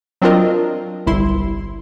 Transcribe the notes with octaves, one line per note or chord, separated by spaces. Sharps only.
F#3 C4 D4 F4 A#4 D#5
G1 C2 E4 C6